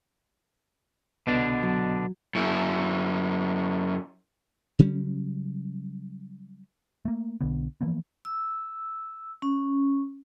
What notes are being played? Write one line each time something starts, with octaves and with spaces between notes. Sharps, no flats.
C2 B2 D3 B3 D4 D#5
F#3
F#2 E4
C#3 F#3 G3 C#4
A3 A#3
B1 D3 B3
E3 F3 A#3 B3
E6
C#4